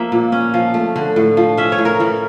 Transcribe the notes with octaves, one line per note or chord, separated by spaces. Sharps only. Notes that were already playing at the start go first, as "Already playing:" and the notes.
Already playing: F3 A#3 E5
A#2
C#4
F3
A3
D3
A2
F3
C#4 E5
C#5
A2
A#4
E3